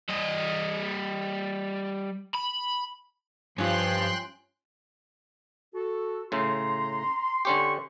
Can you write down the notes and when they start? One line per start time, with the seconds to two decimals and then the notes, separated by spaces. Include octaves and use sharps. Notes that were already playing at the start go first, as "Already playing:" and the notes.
0.09 G3 D#5
2.34 B5
3.58 G2 F3 C#4 F4 G5 C6 F#6
5.75 F#4 A4
6.32 A2 C#3 A#5 C6
7.45 D3 C#4 G4 C#6